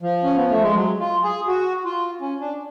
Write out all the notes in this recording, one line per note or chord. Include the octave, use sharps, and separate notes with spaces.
F3
C#4
B3
A3
G#3
F#3
F4
G#4
F#4
F4
C#4
D4